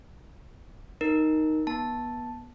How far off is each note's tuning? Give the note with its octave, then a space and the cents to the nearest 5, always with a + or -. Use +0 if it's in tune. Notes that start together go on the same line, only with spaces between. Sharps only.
D#4 +0 A#4 +0
B3 -25 A5 +0